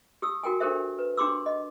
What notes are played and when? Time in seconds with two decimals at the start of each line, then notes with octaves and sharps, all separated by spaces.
0.22 G4 D#6 E6
0.43 F#4 A#4 G5 G#5
0.60 D4 G4 A4 A#4 C5 E5
0.99 B4
1.17 D4 G4 C6 D6 E6
1.46 D#5